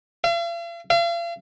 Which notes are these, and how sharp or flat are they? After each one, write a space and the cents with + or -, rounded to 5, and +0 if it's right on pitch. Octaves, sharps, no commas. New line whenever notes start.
F5 -45
F5 -40